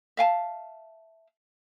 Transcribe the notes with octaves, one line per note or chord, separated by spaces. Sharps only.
E5 F5 G#5 A5